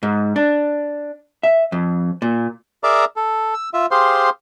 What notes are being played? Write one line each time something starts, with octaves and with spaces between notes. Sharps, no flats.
G#2
D4
E5
F2
A#2
G#4 A#4 D5 E5 A#5 D6
A4
E6
F4 E5
G4 G#4 C5 F5 C6